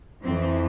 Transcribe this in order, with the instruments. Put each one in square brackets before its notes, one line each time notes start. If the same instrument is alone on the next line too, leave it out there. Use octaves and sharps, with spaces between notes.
[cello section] F2 E3 C4